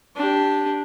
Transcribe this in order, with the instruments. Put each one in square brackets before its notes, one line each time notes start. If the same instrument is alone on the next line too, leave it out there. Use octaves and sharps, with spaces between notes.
[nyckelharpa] D4 G4